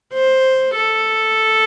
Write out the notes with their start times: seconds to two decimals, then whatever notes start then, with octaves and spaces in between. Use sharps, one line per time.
0.14 C5
0.76 A4